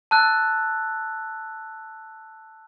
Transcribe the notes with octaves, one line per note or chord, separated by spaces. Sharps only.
A5 E6 F#6 A6